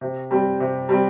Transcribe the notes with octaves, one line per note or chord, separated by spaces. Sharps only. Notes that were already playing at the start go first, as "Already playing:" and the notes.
C3
G3 C4
C3
G3 C4